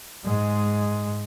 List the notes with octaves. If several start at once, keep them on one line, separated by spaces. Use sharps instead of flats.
G#2 G#3